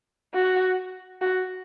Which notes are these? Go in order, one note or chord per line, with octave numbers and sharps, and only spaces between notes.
F#4
F#4